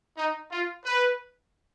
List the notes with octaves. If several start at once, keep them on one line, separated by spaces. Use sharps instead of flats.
D#4
F4
B4